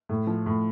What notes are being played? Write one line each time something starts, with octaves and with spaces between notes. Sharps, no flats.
A2
F3
A2